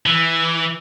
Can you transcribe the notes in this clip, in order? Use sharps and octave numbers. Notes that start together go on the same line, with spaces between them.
E3